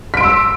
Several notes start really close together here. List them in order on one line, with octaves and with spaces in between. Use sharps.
B6 D7 C6 E6